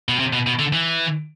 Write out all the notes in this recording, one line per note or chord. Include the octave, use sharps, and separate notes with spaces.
B2
C3
B2
B2
D3
E3